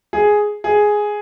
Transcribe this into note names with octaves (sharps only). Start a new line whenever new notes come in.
G#4
G#4